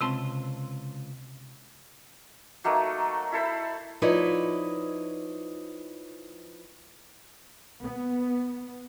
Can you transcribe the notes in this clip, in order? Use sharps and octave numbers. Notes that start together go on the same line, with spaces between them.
C#2 C3 C4 A5 C6
F#3 A3 A#3 D#4
E4 A4 C5 B5
F3 D#4 E4 B4 C#5 D5
B3